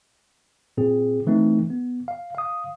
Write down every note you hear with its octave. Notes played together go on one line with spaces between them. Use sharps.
A#2 C4 G#4
E3 A3 C4 D#4
B3
F5
F5 D#6